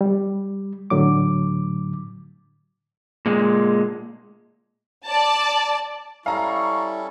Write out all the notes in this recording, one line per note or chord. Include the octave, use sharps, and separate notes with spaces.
G3
A2 D3 F#3 D6
A#2 G#3
D5 A5
G3 C#4 E4 A4 F5 A#5 C#6